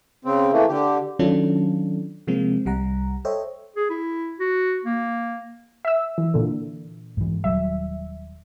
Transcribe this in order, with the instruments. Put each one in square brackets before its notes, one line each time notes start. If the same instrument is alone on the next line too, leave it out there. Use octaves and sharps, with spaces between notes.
[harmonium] C#3 C4
E3 A3 A#3
D3 G4
[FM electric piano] D#3 F#3 C#4 D4 F4 A4
C3 F3 G#3 A#3 C4
C2 G3 F#5 A#5
A4 C5 C#5 D#5 E5 G5
[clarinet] G#4
E4
F#4
A#3
[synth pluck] E5 E6
E3
A#2 D3
[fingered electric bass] G#2 E3
[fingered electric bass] D#1 F#3 G3 [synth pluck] E5